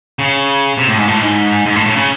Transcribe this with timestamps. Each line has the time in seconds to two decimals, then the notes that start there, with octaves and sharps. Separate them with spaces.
0.19 C#3
0.78 C3
0.88 A2
0.98 G#2
1.08 A2
1.22 G#2
1.66 G#2
1.76 A2
1.86 A2
1.96 C#3